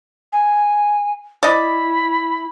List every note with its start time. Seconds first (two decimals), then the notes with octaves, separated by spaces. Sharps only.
0.32 G#5
1.43 E4 D5 D#5 B5